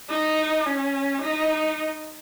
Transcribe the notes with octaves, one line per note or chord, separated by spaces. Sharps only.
D#4
C#4
D#4